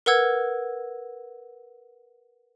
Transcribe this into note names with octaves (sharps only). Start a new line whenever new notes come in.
A#4 B4 F#5 E6 G#6